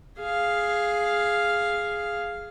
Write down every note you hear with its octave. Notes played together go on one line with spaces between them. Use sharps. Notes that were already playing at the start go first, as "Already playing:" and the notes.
G#4 F5